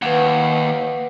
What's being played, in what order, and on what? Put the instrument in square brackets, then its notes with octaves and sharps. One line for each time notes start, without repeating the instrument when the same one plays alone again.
[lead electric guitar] D#2 [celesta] B4 F#5